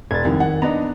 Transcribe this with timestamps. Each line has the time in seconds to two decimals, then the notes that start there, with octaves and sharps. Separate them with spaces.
0.11 E1 G#6 A6
0.25 C2 F2 D#3
0.40 F#5
0.62 B3 D4 D#4 A#5